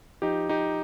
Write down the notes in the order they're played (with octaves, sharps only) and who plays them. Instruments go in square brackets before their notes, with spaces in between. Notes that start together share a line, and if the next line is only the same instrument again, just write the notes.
[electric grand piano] F3 D#4 G4
D#4 G4